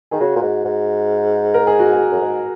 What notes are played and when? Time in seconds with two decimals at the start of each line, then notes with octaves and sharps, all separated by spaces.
0.11 D#3 G#4
0.20 C#3 F#4
0.36 A#2
0.42 G#2
0.65 G#2
1.54 A#4
1.67 G#4
1.79 F#4
1.93 G#4
2.12 F#2
2.21 G#2